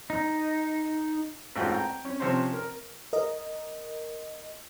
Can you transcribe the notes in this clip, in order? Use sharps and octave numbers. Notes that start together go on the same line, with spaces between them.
D#4
A1 G#2 F4 F#4 G5
G5 A#5
C#4
C3 F3 C#4 C5
A#4
A#4 D#5